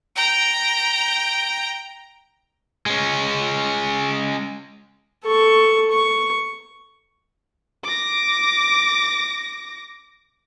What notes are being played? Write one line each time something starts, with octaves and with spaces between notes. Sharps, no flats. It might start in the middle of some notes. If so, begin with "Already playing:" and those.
G5 A#5
G#3 C#4
A4 C#6
C#6
D6 A#6